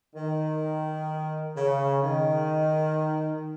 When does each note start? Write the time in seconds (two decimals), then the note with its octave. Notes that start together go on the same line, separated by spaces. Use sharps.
0.15 D#3
1.57 C#3
2.04 D#3